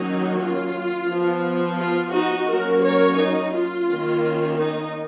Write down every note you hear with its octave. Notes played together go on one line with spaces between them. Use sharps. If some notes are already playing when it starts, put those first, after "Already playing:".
Already playing: D#3 F#3 A#3 C#4 D#4
F4
F3 B3
F4
D#4 F#4
F#3 A#3 C#4 F#4 A#4
A#4 C#5
D#4
F4
D#3 A#3 C#4
D#4